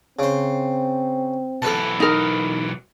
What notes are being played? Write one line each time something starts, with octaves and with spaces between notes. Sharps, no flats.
C#3 C4 C5
B1 E3 A4 B4 A5
D#4 A#4